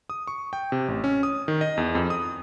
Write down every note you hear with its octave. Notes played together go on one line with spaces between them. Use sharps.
D#6
C#6
G5
C3
A1
C#4
D#6
D#3
D#5
E2
F2
D#6